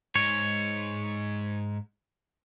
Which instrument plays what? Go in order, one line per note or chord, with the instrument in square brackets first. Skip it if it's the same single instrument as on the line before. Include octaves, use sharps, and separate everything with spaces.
[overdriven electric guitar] G#2 [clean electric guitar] C#5